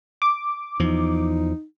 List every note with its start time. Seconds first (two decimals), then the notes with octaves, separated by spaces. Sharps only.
0.22 D6
0.79 E2 F3 D#4